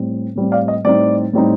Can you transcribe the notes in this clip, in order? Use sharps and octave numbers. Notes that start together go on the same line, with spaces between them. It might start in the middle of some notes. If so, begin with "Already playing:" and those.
Already playing: A2 G3 C4
A2 G3 C4
D5 F5
D#5
A2 G3 C4 D#4 D5
A2 G3 C4 D#4